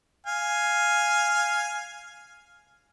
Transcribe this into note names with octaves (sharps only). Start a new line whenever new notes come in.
F5 G#5